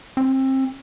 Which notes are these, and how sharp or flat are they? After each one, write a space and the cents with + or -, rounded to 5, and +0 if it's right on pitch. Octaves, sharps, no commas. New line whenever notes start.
C4 +25